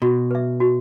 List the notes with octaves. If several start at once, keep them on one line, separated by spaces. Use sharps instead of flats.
B2 F#4
B4 E5
F#4